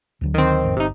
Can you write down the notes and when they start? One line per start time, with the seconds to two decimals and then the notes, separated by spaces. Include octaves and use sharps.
0.21 D2 D3 F#3
0.34 D#3 C4
0.64 A1 F2
0.76 G1 C3 D#4